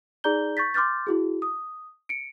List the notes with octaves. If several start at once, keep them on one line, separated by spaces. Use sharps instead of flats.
D#4 G#4 D5 A#5 G6 G7
C#6 G6 A6 B6
C6 D6 F6 G6 A6
E4 F#4 G#4
D#6
C#7 D7